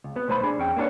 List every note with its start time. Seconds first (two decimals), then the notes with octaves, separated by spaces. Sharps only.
0.04 C#2
0.16 B3
0.28 B1 A3 C5 G#5 B5
0.44 D4 G#4
0.58 E2 C#4 G5
0.76 A#3 B3 D4 A4 B4 C#5